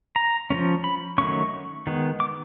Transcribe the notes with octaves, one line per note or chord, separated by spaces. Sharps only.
A#5
F3 A3 C#4
B5
D#3 F#3 A3 C#4 C#6
D#3 G#3 B3
D6